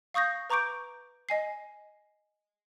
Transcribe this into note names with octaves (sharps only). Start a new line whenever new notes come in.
F5 C#6 D#6 G6 A#6
B4 A#5 C#6 D6 G6 D7
D#5 G#5 C7